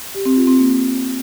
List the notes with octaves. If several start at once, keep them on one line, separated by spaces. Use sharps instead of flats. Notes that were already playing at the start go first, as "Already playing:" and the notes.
G4
C4
F4
C4
A#3